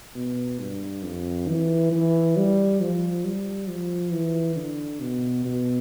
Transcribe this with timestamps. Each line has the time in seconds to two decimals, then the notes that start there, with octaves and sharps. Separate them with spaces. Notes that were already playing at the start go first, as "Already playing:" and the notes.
0.15 B2
0.60 G2
1.03 F2
1.48 E3
1.91 E3
2.37 G3
2.81 F3
3.25 G3
3.69 F3
4.12 E3
4.56 D3
5.00 B2
5.45 B2